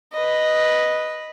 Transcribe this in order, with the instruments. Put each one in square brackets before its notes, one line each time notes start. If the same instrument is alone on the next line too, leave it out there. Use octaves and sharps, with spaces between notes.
[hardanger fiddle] B4 D#5